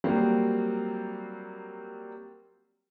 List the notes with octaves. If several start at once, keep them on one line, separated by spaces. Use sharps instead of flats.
F#3 G3 A#3 C4 G4